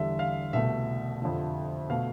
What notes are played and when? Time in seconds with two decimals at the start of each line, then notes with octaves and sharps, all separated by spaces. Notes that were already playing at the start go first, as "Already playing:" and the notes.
Already playing: E2 D3 G3 E5
0.19 F5
0.53 C2 B2 A3 E5
1.22 F2 D3 F3
1.90 B2 A3 F5